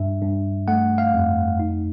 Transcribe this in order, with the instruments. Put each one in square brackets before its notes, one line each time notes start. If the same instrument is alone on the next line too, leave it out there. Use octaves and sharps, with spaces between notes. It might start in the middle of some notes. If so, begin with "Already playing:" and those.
Already playing: [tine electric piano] G2 E5
G2
A3 F#5
F5
F2
D#4